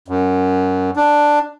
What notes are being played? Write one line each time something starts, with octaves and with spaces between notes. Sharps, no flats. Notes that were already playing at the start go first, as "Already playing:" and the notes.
F#2
D4